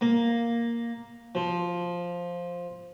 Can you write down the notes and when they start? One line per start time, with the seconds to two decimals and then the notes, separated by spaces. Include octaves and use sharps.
0.01 A#3
1.35 F3